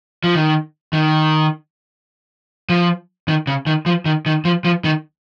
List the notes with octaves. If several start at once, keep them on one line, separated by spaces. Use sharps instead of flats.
F3
D#3
D#3
F3
D#3
C#3
D#3
F3
D#3
D#3
F3
F3
D#3